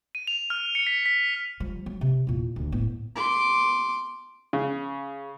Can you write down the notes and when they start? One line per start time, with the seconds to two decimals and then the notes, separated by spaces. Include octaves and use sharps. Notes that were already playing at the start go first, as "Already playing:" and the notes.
0.15 D#7
0.27 F7
0.50 F6
0.75 C#7
0.87 B6
1.06 B6
1.60 F3 G3
1.86 F#3
2.01 C3
2.27 E2 A#2
2.56 D2 D#3
2.72 A2 B3
3.15 C6 D6
4.53 C#3